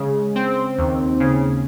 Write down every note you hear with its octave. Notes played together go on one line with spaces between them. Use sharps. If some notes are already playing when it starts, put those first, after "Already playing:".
Already playing: C#3 G#3
C4
D#2
C#3